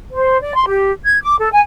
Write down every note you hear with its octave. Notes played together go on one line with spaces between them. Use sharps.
C5
D5
C6
G4
G#6
D6
A4
G#5